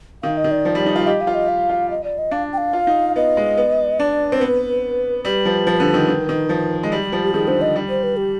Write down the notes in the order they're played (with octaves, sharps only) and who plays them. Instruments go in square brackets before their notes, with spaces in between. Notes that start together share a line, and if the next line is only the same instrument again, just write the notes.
[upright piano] D#3 [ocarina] F5
[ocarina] D#5
[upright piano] D#3
[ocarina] D5
[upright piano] F3
G3
D#4
[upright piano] F4 [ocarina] F5
[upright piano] G4 [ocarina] D#5
[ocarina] F5
[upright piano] F4
[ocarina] D#5
F5
[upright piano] F4
[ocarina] D#5
D5
D#5
[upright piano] D4 [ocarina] F5
[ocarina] G5
F5
[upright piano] F4
D#4
[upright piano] B3 [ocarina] D#5
[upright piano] G#3
B3
[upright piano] D4 [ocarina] D5
[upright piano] C4
[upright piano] B3 [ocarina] B4
[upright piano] G3 [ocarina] B4
[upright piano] F3
F3
D3
D#3
D#3
D#3
F3
G#3
G3
[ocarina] G4
[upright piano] F3
[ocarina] G4
[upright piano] D#3 [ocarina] G#4
[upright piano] D3 [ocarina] C5
[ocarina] D#5
[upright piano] G3
[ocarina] C5
B4
G4